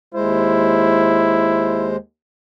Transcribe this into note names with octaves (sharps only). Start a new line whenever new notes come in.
D#2 G#3 E4 C5